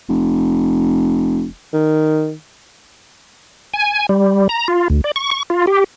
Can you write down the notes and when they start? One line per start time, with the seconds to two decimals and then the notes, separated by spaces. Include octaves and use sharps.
0.09 F1
1.73 D#3
3.74 G#5
4.09 G3
4.49 A#5
4.68 F4
4.90 D2
5.04 D5
5.16 C#6
5.31 C#6
5.50 F4
5.67 G4